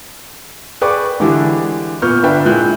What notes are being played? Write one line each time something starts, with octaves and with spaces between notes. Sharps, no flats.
G#4 B4 D5 G5 C#6 D6
D3 E3 G#3 D4 E4 G4
A#2 B3 C#6 F6 G6
G1 D4 B4 E5 G5
A#2 G#3 E4 F#6 G6